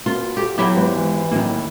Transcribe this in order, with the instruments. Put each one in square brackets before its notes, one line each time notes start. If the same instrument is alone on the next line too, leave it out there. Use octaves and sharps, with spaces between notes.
[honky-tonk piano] B2 A#3 C#4 [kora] F4
[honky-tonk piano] F#4 A4 [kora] G4
[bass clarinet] F#3 [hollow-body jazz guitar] B3 E4 B5 [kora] G4 G5
[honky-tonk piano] G#1 B4
[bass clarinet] E3
[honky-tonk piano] A2 F#3 C#4 [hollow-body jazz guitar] D#3 A#3